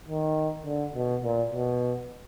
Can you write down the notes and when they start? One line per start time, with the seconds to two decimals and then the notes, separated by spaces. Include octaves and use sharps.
0.08 D#3
0.66 D3
0.95 B2
1.23 A#2
1.53 B2